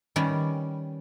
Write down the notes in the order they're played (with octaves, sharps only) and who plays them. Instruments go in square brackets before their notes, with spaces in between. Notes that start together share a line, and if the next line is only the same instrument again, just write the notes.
[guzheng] D#3 G3 C#4 B4